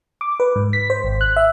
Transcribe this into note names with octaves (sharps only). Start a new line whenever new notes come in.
D6
B4
G#2
B6
C5
G#1
F#6
E5